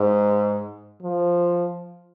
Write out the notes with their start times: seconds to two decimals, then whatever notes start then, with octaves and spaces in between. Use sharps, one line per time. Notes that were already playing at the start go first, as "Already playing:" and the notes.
Already playing: G#2
1.02 F3